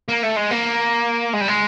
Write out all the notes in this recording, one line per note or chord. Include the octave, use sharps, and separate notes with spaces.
A#3
A3
G#3
A#3
G#3
G3
G#3